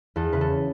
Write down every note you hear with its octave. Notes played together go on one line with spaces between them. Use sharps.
E2 A4
C#3 E3 B4
A4